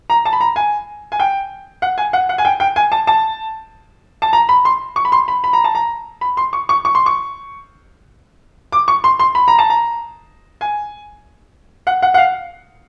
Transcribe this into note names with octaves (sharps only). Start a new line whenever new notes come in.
A#5
A5
B5
A#5
G#5
G#5
G5
F#5
G#5
F#5
F#5
G#5
G5
G5
G#5
A5
A5
A5
A#5
B5
C6
C#6
B5
C6
B5
B5
A#5
A5
A#5
B5
C6
C#6
C#6
C#6
C6
C#6
D6
C#6
C6
C6
B5
A#5
A5
A#5
G#5
F#5
F#5
F#5
F5